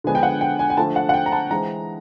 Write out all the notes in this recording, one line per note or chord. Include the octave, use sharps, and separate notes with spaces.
D3 F3 G#3 B3 D4 G#5
G5
F#5
G5
G#5
G#5
D3 F3 A3 A5
F#5
F#5
G5
A#5
A5
E3 G#3 C4 A#5